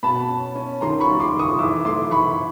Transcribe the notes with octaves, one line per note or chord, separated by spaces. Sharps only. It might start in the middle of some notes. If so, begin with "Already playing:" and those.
B2 A5 B5
C#4
C#4
D#3 A#5 C6
B5 C#6
G3
C6 D6
D#3
C#6 D#6
E3 D6 E6
A3 C6 D6
E3 B5 C#6